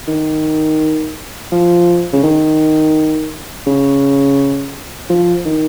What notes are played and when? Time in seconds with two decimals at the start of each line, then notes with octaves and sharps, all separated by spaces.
0.08 D#3
1.51 F3
2.13 C#3
2.23 D#3
3.67 C#3
5.10 F3
5.45 D#3